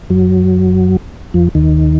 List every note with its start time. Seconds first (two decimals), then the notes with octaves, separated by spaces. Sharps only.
0.10 F#2 F#3
1.34 F2 F3
1.55 D#2 D#3